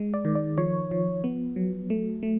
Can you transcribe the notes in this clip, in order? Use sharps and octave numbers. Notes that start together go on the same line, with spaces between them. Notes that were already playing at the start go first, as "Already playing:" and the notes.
Already playing: G#3
D5
D#3
D5
F3 C#5
F3
B3
F#3
A3
A3